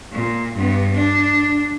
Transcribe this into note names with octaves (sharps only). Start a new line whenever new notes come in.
A#2
G2 B3
D4